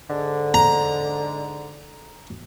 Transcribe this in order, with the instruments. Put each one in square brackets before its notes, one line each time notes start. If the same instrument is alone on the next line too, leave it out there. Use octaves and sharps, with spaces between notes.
[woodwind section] G#2 D3
[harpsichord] A#5